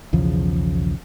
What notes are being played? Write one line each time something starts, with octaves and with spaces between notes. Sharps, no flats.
B1 E2 C#3 F3